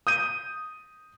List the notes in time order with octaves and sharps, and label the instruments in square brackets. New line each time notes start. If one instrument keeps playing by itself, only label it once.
[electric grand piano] D#6 G6 D#7